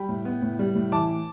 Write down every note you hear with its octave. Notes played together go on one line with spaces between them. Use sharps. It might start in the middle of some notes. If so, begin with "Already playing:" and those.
Already playing: G3 G5 B5
A2
B3
A2
G3
A2
E3 A5 D6